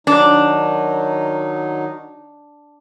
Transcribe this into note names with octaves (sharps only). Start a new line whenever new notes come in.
D#3 F#3 D4 D#4